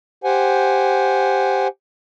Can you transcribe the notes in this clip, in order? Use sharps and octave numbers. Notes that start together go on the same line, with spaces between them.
G4 C5 F#5 G#5